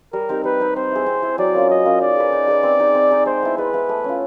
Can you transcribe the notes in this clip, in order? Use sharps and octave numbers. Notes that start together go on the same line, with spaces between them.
G3 A#4
C4 D#4 G4
G3 B4
C4 D#4 G4
C4 C5
E4 G#4
C4
E4 G#4
F#3 D5
A#3 C#4 F4
F#3 D#5
A#3 C#4 F4
D#4 D5
G#4 B4
D#4
G#4 B4
C4
D#4 G#4
C4
D#4 G#4
G#3 C5
B3 E4
G#3 B4
B3 E4
A3
C#4 F4